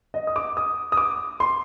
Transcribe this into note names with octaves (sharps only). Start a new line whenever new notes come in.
D#5
D#6
D6
D#6
D#6
D6
C6